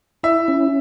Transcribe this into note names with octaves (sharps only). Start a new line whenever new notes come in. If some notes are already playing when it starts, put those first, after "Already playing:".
E4 E5
C#4